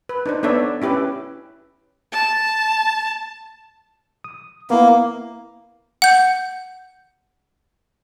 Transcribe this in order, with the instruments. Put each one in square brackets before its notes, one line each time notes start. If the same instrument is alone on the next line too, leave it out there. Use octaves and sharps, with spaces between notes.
[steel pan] B4
D4 D#4 C5
B3 D4 A4 C#5 D5 E5
C#4 E4 G4 B4 E5
[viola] A5
[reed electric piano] D#6
[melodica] A#3 [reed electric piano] B3 E4
[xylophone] F#5 G6